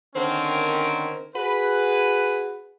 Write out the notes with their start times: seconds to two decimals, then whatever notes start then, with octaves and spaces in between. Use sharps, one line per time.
0.15 D3 D#3 C4 C#4 A#4
1.35 F#4 G#4 B4